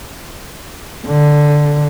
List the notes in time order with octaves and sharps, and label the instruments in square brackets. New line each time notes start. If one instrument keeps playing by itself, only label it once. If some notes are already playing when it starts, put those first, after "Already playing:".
[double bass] D3